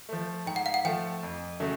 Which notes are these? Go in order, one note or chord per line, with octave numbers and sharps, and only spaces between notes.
F3 A3
G#2 G5
F#5
F5
F#5
F3 A3 G5
F2
C#3 F#3 A3